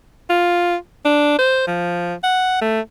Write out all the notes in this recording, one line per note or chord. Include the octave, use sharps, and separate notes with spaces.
F4
D4
C5
F3
F#5
A3